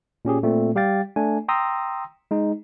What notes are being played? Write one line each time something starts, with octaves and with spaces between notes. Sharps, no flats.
A#2 C#4 G4 G#4
A#2 A3 C4
G3 G4 F5 G5 A6
A3 D4 G#5
G5 A#5 C6 D#6 E6 A#6
G#3 D#4